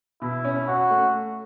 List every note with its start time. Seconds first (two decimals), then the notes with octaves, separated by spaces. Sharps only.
0.22 B2 E4
0.45 C#4
0.67 C#4 F#4
0.90 A3